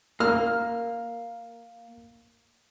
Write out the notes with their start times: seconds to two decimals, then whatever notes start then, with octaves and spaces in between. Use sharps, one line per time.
0.20 A#3 F6